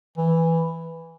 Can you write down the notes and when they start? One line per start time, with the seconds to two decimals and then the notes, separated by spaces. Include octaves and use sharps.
0.18 E3